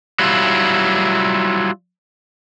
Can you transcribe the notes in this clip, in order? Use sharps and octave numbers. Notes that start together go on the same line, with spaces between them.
F#3 G3 E4 F4